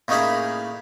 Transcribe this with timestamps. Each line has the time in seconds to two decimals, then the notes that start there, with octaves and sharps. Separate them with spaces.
0.08 A2 A#3 C#4 D#4 G#4 B5